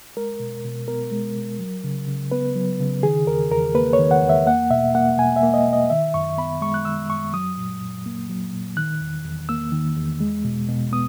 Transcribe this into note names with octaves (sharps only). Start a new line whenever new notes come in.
G#3 A#4
B2
B2
B3 A#4
G#3
B2
F#3
C#3
C#3
B3 B4
F#3
C#3
D#3 G#4
E2 A#4
E2 A#4
A#3 B4
C#5
D#3
F#5
E2
E5
A#3 F#5
B2 E5
A#3 F#5
B2 G#5
E5
A#3
D#5
B2
D#5
D#3 E5
F#2 C#6
B3 B5
G#3 C#6
F#6
D#3 E6
F#2 C#6
F#3 D#6
A#2
A#2
A#3
F#3
A#2
D#3 F#6
E2
E2
A#3 E6
D#3
E2
G#3
B2
B2
B3 D#6